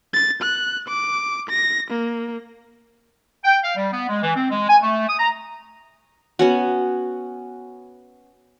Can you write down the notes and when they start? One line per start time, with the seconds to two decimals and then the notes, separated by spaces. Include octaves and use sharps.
0.14 A6
0.42 F#6
0.88 D6
1.49 A#6
1.91 A#3
3.44 G5
3.63 F5
3.76 G3
3.92 B3
4.09 G#3
4.23 E3
4.35 C4
4.51 G#3
4.68 G#5
4.81 A3
5.07 D#6
5.18 A#5
6.39 B3 C#4 F#4